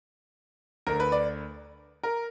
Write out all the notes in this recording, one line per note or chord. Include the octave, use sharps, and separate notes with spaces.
D2 D3 A#4
B4
D5
A#4